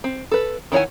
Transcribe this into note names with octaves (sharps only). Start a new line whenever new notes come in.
C4
A4 B4
D#3 E4 C#5 F#5 G#5